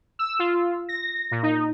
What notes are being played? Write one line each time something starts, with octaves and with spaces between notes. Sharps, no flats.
E6
F4
A#6
A#2
D#4